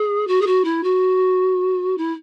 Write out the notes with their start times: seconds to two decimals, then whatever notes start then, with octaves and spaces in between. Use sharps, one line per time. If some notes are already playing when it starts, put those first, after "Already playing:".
Already playing: G#4
0.27 F#4
0.41 G#4
0.47 F#4
0.64 E4
0.83 F#4
1.97 E4